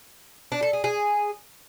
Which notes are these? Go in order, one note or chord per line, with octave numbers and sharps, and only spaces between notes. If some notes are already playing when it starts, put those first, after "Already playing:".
D4
A4
G#4
G#4